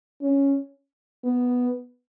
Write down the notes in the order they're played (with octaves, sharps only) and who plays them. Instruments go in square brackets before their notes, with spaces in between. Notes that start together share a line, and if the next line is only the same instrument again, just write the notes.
[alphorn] C#4
B3